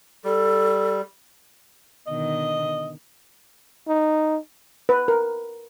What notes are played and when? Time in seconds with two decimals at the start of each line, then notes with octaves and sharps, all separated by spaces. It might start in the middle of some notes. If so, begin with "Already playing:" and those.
0.25 G3 A4
2.07 B2 D3 D#3 D#5
3.88 D#4
4.89 B4
5.08 A#4